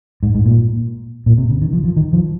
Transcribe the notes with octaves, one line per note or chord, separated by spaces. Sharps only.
G#2
G#2
A#2
A#2
C3
C#3
D#3
F3
F3
D#3
F3